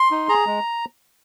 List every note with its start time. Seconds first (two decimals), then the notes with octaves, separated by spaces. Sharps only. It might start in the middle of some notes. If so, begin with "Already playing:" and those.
Already playing: C6
0.11 D#4
0.28 G#4 A#5
0.47 G#3